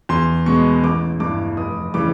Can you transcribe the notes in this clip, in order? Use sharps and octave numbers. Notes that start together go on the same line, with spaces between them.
E2 C6
B2 G#3 B3 C#6
A1 D6
G2 E3 D6
F1 D#6
C#3 E3 G3 D6